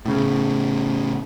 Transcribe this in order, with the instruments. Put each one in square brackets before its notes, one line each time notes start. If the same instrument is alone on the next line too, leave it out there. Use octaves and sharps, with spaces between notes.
[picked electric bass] A2 C#3